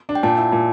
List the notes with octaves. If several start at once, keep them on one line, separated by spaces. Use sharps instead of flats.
D4
G5
A#2 A5
E4
A#2